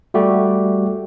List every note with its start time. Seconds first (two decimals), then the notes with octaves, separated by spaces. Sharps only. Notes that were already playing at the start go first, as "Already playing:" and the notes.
0.14 G3 A3 F#4 G4